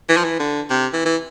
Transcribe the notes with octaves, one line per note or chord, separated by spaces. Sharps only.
E3
F3
E3
D3
C3
E3
E3